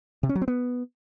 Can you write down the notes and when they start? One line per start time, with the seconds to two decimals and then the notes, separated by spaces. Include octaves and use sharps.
0.23 C3
0.29 C#4
0.35 F#3
0.42 C4
0.48 B3